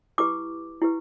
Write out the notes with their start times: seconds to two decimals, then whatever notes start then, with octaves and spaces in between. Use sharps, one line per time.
0.18 E4 G4 B4 D6
0.82 E4 G4 B4